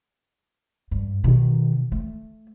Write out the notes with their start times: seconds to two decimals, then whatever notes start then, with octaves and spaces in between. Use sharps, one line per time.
0.91 G2
1.24 B2 D#3
1.92 A3